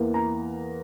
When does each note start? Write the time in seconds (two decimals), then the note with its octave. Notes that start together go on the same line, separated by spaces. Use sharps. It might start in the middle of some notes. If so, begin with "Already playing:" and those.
Already playing: E2 E3 A#3
0.14 A#5